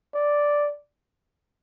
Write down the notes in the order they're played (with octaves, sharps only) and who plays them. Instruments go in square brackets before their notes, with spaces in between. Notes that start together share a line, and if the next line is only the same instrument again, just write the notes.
[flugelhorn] D5